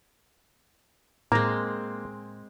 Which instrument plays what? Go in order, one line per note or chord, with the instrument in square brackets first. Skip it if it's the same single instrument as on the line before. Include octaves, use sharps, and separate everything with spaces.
[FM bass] A2 [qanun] G#3 C4 [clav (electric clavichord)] A#3 [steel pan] A#5